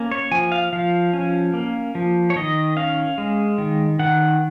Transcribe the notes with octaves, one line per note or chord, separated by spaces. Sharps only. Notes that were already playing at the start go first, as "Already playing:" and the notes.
Already playing: A#3 C#4
C#5
F3 G#5
F5
F3 F5
C#4
A#3
F3
C#5
D#3 D#5
C#4 F5
G#3
D#3
D#3 F#5